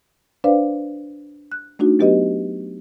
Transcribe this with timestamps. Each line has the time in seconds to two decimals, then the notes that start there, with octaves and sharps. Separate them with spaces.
0.44 D4 B4 C5 D5 F5
1.52 F#6
1.79 A3 D4 D#4 F#4
1.99 F#3 B3 G4 B4 D#5